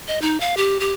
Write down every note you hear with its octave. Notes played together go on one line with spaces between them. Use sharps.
D#5
D#4
F5
G4
G4